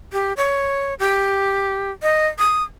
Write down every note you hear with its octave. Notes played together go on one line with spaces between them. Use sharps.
G4
C#5
G4
D#5
D#6